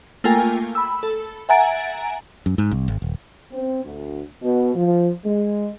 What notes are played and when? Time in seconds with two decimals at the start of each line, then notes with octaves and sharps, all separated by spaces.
0.24 A3 A#3 F4 A#4 G5 G#5
0.75 B5 E6
1.03 A4
1.49 E5 F#5 G#5 A#5 A6 D7
2.46 F#2
2.58 G#2
2.71 C2
2.88 G#1
3.02 D#1
3.52 C4
3.84 D2
4.43 B2
4.74 F3
5.24 G#3